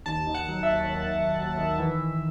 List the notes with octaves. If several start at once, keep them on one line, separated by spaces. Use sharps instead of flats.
D#2 A5
D#3
F#5
F#3
E5
D#2
D#2
D#2
D#2
D#3
E3
E3